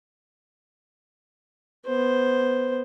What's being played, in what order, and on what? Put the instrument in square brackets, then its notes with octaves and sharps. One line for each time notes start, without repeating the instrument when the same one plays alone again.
[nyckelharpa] B3 C5